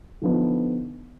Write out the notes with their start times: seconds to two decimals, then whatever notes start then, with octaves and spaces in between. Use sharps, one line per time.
0.22 D3 F3 B3 D#4 B4